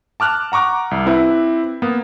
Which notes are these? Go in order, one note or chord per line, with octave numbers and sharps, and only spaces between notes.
A5 D6 F6 F#6
F#5 A#5 C#6 D6 F#6
C2
C4 E4 B4
A#3 B3